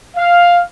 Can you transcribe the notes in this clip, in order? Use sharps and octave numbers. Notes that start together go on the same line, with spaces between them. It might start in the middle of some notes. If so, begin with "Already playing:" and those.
F5